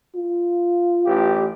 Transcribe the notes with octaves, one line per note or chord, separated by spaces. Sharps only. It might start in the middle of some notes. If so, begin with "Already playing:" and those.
F4
A1 G4